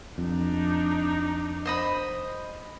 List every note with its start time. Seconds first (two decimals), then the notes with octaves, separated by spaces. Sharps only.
0.18 F2 D4 D#4
1.65 C5 D#5 B5